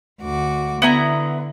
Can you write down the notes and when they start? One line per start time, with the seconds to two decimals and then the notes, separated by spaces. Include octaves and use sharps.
0.22 D2 F#4 D6
0.82 D3 B3 E4 A#5